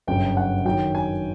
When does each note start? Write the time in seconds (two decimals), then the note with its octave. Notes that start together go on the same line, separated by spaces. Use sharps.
0.07 G1 F#2 C#3 G5
0.37 F#5
0.65 F#2 D#3 F#3 G5
0.95 G#5